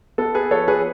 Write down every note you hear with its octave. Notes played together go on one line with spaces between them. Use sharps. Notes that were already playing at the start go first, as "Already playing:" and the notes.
B3 A4
G#4 B4
F3 A4 C#5
G#4 B4